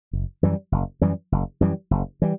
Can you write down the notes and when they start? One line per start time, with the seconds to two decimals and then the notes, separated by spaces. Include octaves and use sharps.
0.13 F#1
0.43 F#2 E3 G3
0.72 F#1
1.01 F#2 E3 G3
1.32 F#1
1.61 F#2 E3 G3
1.91 F#1
2.22 E3 G3